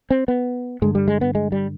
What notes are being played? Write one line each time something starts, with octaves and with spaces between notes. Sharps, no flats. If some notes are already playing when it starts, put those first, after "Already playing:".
C4
B3
G2 D3 G#3
G3
G#3
B3
G#3
G3